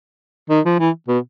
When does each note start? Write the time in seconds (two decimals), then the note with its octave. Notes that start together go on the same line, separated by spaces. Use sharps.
0.50 D#3
0.65 F3
0.79 E3
1.08 B2